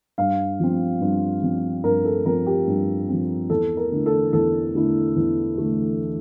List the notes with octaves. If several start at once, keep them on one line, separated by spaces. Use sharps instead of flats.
G2 F5
F3 C4
G2
F3 C4
G2 A#4
A4
F3 C4 A#4
G4
G2
F3 C4
E2 A4
A#4
D3 A3 E4
A4
E2 A4
D3 A3 E4
E2
D3 A3 E4